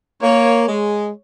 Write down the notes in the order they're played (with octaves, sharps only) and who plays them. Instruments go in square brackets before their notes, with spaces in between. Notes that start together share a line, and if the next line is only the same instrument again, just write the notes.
[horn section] A#3 [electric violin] C#5
[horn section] G#3